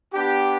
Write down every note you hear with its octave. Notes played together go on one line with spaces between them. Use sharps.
B3 D4 G4